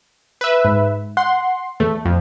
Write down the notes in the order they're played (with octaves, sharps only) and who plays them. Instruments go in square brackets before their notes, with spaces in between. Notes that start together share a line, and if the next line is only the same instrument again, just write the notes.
[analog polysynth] B4 E5
[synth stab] G#2
[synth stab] F#5 [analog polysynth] C6
[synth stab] E2 [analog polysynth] A3
[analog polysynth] F2